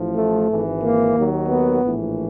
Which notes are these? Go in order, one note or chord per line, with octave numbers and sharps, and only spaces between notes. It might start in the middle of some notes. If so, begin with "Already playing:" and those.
Already playing: A1 A2 F3
A3
G#1 G#2 E3
A#3
D#2 D#3 F#3
B3
A#1 A2 E3